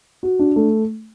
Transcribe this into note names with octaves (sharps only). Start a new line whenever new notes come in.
F#4
D4
A3